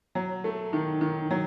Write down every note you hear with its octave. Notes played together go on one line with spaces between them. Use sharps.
F#3
A3
D#3
D#3
F#3